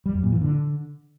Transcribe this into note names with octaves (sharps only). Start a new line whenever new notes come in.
G3
F#2
A#2
E3
D3